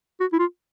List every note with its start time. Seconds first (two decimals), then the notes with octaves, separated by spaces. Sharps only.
0.20 F#4
0.33 E4
0.39 F4